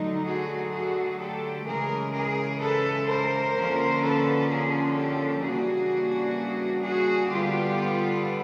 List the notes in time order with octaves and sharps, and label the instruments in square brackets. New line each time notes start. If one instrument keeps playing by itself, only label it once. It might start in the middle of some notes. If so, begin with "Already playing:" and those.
Already playing: [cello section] D3 F#3 A3 D#4
F#4 G#4
F#4 G#4
G4 A4
C#3 E3 G#3 G#4 A#4
G#4 A#4
A4 B4
A#4 C5
D3 F3 A#3 C#4
A4 B4
G#4 A#4
G4 A4
C#3 E3 G3 A#3 D4 F#4 G#4
F#4 G#4
D3 G3 B3 F4 G4